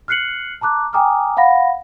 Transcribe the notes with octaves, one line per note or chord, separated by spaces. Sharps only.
F6 F#6 C7 C#7 F#7
A5 A#5 D6 F#6
G5 G#5 A#5 D6 D#6 F6
F5 F#5 B5 A#6